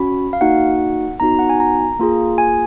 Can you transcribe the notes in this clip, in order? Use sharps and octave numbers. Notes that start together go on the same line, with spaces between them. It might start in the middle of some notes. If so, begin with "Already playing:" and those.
Already playing: C#4 F#4 B5
F5
A#3 D#4 F#4 F#5
B3 D#4 F#4 A#5
F#5
G#5
A#5
A#3 F4 G#4
G#5